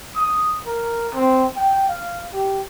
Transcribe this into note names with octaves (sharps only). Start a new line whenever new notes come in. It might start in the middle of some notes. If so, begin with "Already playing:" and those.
D#6
A#4
C4
G5
F5
G4